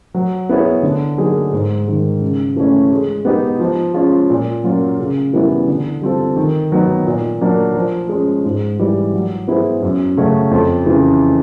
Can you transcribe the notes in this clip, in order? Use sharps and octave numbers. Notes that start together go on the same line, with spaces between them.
F#3
B3 E4 G#4 C#5
D3
F#3 A#3 D#4 G#4
G#2
D#3 G#3
C#3
E3 A3 C#4
G#3
B3 D#4 G4
F3
G#3 C#4 F4
A#2
F#3 A#3 C#4 F4
C#3
E3 G3 B3 E4
D3
G3 C4 F4 A4
D#3
F#3 B3 D#4
A#2
F#3 A#3 D4
F3
G#3 C#4
G#2
E3 G3
F#3
B3 E4 G#4 C5
F#2
C#3 F#3 A3 C#4
F2
C#3 E3